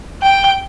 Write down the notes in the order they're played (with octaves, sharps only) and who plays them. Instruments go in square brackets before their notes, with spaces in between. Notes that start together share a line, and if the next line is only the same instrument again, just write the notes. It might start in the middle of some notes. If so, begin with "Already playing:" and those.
[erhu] G5